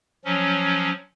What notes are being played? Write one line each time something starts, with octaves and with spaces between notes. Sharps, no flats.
F3 F#3 C#4